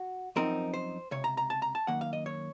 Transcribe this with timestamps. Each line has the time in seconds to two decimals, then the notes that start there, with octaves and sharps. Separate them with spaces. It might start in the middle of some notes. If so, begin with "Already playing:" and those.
Already playing: F#4
0.36 F#2 F3 C4 D#4 A#4
0.74 C5
1.11 C#2 C3 C#5
1.24 A#5
1.37 A#5
1.50 A5
1.62 A#5
1.75 A5
1.87 F#2 D#3 A#3 F#5
2.01 F5
2.13 D#5
2.26 C#5